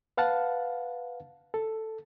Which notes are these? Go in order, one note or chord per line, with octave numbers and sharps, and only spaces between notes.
B4 F5 F#5 A5
A4